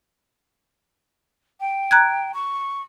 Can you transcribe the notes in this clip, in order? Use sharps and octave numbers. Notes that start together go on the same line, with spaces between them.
G5
A#5 F#6 G#6
C#6